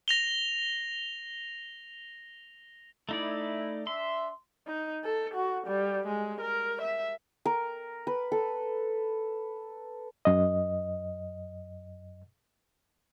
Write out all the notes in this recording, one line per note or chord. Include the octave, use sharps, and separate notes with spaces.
A#6 F7 G7
A3 D#4 E4 D5
D4 E5 C6
D#4
A4
F#4
G3
G#3
A#4
E5
A#4
B4
A4
F#2 D#5